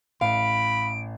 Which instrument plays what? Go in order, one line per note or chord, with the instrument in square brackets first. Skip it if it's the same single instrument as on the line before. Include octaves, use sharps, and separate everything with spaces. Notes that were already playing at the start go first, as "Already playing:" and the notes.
[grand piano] A1 [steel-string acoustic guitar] F5 [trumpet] B5 [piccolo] D7